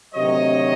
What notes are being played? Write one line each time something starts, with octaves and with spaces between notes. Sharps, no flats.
D2 C3 D#3 F#3 C#5 D#5